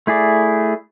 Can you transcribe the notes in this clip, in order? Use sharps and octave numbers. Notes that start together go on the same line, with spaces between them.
A3 E4 G#4 D5